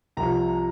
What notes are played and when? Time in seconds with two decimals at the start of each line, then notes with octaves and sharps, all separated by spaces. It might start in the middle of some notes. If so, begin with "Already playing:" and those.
0.17 C2 C3 F3 A#5